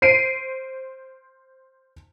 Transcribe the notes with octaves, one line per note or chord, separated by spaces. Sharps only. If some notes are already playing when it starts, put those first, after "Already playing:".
C5 C7 D7 D#7